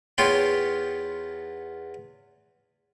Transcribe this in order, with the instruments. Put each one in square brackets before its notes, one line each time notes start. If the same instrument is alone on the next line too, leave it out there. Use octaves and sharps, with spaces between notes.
[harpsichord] E2 B3 F4 C#5 G5 C6